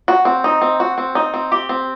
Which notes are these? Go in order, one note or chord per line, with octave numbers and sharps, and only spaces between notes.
F#4
C4
D#4
C4
F#4
C4
D#4
C4
G4
C4